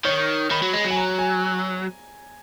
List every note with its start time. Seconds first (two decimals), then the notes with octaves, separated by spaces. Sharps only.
0.05 D#3 C#5
0.51 D#3 B5
0.62 F#3
0.73 G#3
0.85 F#3
0.90 G#5
0.97 A#5
1.19 G#5